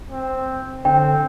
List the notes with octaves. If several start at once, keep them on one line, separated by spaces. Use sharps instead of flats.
C4
D3 C4 G5